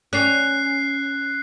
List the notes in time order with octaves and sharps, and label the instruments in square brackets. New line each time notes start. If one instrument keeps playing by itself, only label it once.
[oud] C#4 [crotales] F#6 C7